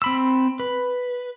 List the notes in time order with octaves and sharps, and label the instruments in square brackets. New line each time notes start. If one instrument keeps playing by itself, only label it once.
[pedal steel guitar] C4 B5 E6
B4